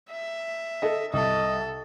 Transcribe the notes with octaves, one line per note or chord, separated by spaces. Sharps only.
E5
A4 D#5
C2 A4 D#5